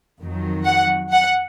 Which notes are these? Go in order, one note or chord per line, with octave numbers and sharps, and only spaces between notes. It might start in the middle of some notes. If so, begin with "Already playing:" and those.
F2 D#3 F#3
F#5
F#5